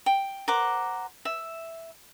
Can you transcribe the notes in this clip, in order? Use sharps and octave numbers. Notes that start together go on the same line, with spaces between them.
G5
A#4 C5 F#5 D6
E5